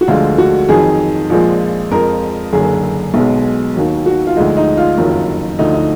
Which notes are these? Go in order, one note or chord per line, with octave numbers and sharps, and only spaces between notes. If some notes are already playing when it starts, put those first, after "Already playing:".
F#4
D2 D3 F3 G#3 F4
F#4
F2 D#3 F#3 G#4
A#1 A#2 F3 G#3
F2 F3 G#3 A#4
F#1 F#2 D3 G#4
B1 B2 G#3
D#2 D#3 F#3
F#4
F4
D2 D3 F3 G#3 D#4
D#4
F4
F#1 F2 D#3 F#3
D2 D3 F3 D#4
D#4